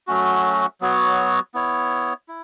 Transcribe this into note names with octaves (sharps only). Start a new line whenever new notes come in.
F#3 A3 C#4 F#4
F#3 B3 F#4 C#5
B3 E4 C#5
E4